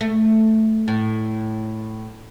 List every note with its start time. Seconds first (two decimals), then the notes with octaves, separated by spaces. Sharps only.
0.01 A3
0.88 A2